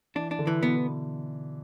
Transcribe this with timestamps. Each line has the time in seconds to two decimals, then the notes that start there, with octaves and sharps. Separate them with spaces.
0.15 E3 D4
0.31 D4
0.39 D3
0.47 E3
0.62 B2 B3